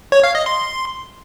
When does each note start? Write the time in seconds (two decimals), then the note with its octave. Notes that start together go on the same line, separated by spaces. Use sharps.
0.12 C#5
0.24 F5
0.35 D#5
0.46 C6